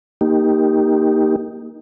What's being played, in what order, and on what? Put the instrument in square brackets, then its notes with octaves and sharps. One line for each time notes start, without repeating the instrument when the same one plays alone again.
[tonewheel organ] A#3 D#4 G4